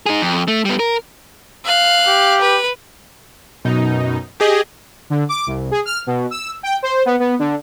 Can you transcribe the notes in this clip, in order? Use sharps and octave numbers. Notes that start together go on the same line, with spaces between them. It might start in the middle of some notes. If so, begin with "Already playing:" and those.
D#4 G#4
F2
A3
G3 B3
A#4
F5 F#6
G4
B4
F#2 B2 D#4
G4 G#4 D#5
D3
D6
C2
G#4
F6
B2
E6
G5
C5
B3
B3
D3